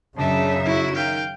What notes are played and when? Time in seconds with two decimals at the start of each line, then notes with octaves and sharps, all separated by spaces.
0.18 F#2 C#3 D4 D#4 E5
0.65 E4 F#4
0.95 D#3 F5 G5